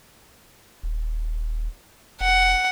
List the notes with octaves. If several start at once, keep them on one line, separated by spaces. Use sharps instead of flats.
D#1
F1 F#5